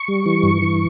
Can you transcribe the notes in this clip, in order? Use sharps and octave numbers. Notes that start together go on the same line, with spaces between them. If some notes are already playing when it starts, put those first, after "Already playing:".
Already playing: C#6
G3
E3
G2
E3